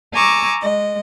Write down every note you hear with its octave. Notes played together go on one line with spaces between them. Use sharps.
G#5 A#5 C#6 D6 E6
G#3 D#5